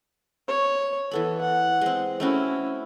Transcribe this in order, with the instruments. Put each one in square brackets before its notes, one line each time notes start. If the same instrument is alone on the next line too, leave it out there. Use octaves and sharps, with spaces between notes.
[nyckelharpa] C#5
[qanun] E3 B3 B5 [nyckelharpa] A4
[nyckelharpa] F#5
[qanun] G#3 C4
[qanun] A3 C4 F#4 [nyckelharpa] C#4 E4